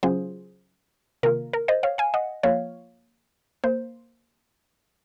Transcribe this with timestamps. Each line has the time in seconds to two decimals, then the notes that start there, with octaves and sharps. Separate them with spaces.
0.03 C#3 F#3 C#4 F4 G#4 C5
1.23 C3 D#3 A#3 F4 A#4
1.53 A#4
1.68 C5 D#5
1.83 C#5 F5
1.98 F5 G#5
2.14 D#5 F#5
2.43 F3 A#3 F4 C#5 F5
3.64 A#3 C5